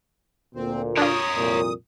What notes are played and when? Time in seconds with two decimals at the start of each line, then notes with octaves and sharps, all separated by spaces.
0.55 D2 A#2 C4
0.97 D4 F4 A#4 C#5 D#6
1.35 C2 F2 A#2